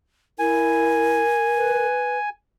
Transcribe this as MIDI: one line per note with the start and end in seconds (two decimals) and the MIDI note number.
0.39 1.21 64
0.39 1.86 70
0.39 2.29 80
1.57 2.18 71